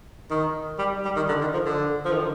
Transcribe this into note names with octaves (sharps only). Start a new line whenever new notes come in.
D#3
G3
G3
D#3
D3
D#3
F3
D3
F3
D#3
D3